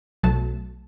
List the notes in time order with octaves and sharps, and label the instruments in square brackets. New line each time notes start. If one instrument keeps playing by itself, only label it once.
[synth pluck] B1 B2 F#3 A3 A5